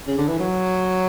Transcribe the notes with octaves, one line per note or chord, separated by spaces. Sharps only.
C#3
D3
E3
F#3